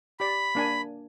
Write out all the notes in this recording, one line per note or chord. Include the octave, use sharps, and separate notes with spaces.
G4 D5 B5
A#3 D4 G#5